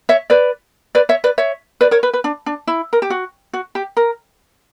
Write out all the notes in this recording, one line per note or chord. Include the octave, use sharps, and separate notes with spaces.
C#5 E5
B4 D5
B4 D5
C#5 E5
B4 D5
C#5 E5
B4 D5
A#4 C#5
B4
B4
D4
D4
E4
A#4
G4
F#4
F#4
G4
A#4